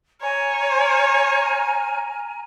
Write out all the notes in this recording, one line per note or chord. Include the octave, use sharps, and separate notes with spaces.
C#5 G#5 A#5 F6